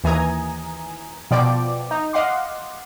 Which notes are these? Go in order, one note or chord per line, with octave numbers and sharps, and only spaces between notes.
D#2 E3 G#5 A#5 D#6 G#6
B2 F3 D5 G5 D7
D#4
D#5 F5 F#5 C6 D6